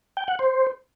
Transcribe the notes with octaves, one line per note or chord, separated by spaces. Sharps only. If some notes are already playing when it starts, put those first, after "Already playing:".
G5
F#5
C5